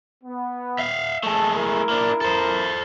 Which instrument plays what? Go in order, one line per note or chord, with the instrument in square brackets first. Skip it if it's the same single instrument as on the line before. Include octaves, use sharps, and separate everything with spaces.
[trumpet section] B3
[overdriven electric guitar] E5 F5
[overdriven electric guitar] G#3 A3 [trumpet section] A5
[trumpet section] E4 A#4
[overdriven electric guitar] A#3 D4
A4 C5